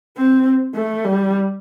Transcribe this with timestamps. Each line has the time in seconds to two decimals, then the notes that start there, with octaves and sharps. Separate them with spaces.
0.17 C4
0.75 A3
1.05 G3